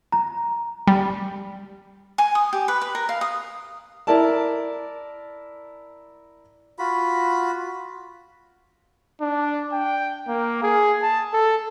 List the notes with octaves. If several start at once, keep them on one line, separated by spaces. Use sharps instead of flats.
A#5
G3
G#5
D#6
G4
B4
B4
A#4
F5
D#6
E4 A#4 D5 A5
F4 F#4 B5
D4
G5
A#3
G#4
A5
A4